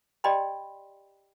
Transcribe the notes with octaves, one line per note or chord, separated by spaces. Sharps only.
G4 D5 D#5 G5 B5 C6